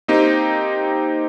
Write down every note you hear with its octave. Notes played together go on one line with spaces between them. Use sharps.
A#3 C4 D#4 G4